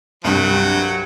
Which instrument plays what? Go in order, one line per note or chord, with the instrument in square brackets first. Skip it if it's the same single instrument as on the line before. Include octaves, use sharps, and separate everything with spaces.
[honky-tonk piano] C2 G2 [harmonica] F#3